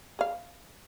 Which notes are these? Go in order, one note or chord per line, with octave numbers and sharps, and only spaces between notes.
G#4 F5